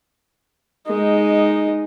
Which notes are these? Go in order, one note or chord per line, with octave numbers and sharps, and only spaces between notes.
G#3 D#4